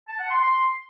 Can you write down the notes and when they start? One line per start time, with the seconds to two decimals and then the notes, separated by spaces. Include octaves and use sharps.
0.09 A5
0.19 F#5
0.30 C6
0.40 C6